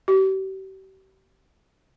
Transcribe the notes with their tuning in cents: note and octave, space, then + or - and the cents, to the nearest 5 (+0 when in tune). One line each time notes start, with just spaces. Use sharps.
G4 -40